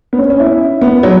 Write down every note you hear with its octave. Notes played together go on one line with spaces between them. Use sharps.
B3
C#4
C#4
E4
B3
F#3